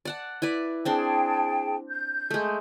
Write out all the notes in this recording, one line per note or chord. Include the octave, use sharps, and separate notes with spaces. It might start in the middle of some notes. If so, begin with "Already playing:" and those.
D5 F#5 A5
E4 B4 D5
C4 D4 G#4 G5 A5 C6
G6
G#3 A3